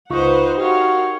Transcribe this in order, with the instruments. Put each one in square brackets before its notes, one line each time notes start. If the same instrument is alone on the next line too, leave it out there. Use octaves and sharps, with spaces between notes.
[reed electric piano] C#2 F4 C#6 [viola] D#4 [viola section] B4 C5 F#5
[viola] D#4 C#5 [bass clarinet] F#4 [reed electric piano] G4 [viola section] A#4 F5